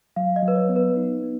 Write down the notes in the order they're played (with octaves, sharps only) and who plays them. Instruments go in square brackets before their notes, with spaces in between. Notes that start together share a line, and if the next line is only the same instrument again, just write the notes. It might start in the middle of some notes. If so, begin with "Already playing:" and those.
[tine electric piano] F#3 [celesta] F5
[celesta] D#5
[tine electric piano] F#3
[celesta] B4
C#5
[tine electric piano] B3
[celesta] B4
[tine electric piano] D#4
B3